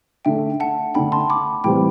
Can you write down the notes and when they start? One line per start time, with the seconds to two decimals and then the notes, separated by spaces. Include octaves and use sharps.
0.25 D3 A3 D4 A4 E5 G5
0.60 F#5 A5
0.94 D3 A3 D4 A4 G5 B5
1.12 A5 C6
1.30 B5 D6
1.64 A2 E3 G3 C4 G5 B5